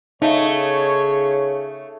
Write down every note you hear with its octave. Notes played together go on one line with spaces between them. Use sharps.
C#3 A3 D#4 C#5